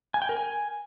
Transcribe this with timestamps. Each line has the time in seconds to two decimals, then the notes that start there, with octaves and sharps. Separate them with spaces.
0.14 G#5
0.22 G5
0.29 A#4
0.37 G#5